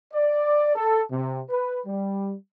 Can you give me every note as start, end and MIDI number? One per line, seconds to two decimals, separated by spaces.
0.13 0.72 74
0.76 1.03 69
1.11 1.41 48
1.50 1.80 71
1.86 2.34 55